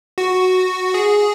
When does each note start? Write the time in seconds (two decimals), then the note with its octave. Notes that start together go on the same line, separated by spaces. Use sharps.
0.18 F#4
0.94 G#4